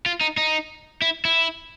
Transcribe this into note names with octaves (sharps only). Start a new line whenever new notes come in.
F4
D#4
D#4
E4
E4